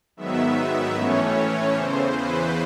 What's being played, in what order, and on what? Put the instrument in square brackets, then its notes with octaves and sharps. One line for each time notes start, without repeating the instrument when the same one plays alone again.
[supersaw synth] G#2 D#3 F#3 B3 E5
A2 E3 A3 C#4 C#5
E2 C#3 E3 C5
B4